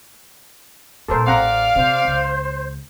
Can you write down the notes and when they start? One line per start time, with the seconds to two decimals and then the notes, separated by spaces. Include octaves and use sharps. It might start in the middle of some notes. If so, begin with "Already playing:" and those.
1.09 G2 A#2 A4 A#4 C5
1.27 A1 C4 D5 F5 F#5 A#5
1.76 C3 C5
2.05 C#2